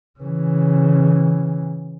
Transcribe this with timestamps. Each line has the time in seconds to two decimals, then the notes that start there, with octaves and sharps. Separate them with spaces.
0.20 C#3 E3